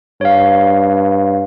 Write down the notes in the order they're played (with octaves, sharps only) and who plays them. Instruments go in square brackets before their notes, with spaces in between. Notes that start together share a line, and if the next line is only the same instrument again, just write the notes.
[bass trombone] G2 [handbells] C#5 F5